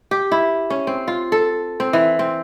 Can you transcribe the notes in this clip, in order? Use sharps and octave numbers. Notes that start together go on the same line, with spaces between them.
G4
E4
C#4
C4
F4
A4
C4
E3
C4